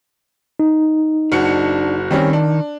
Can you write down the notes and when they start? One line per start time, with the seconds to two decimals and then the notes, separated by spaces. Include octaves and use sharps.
0.60 D#4
1.32 F#1 D4 F#4 C#7
2.11 D#3 G3 C4 C#4
2.33 D4